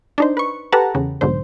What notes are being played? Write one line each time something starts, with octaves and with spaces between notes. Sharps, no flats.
D4 D#4 C5
B4 C#6
G4 A4 B4 F#5 A5 A#5
E2 C#3
B1 G#2 D3 C5